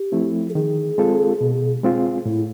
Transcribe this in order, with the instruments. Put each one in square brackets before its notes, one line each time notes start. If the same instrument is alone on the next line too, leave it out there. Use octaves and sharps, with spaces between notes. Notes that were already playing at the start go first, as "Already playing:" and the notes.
Already playing: [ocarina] G4
[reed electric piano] F3 A3 C4 E4
[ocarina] A4
[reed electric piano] D#3 [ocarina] G#4
[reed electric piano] G#3 C4 F4 A4
B2
G#3 C4 F4 G#4
[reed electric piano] A2 [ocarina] E4